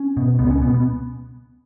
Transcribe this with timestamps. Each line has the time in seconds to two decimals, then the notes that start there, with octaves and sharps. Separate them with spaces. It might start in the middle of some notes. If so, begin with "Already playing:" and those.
Already playing: C#4
0.17 B2
0.39 C#2 B3
0.51 C#4
0.62 B2 B3
0.74 B3